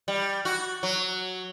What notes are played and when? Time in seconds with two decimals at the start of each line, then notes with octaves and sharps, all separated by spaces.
0.08 G3
0.45 F#4
0.83 F#3